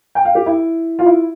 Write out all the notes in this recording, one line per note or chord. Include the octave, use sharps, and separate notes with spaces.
G5
F5
G4
E4
F4
E4